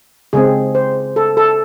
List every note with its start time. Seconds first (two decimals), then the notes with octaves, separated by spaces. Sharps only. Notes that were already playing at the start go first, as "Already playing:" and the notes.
0.33 C#3 G#3 C4 G#4
0.75 C5
1.16 A4
1.37 A4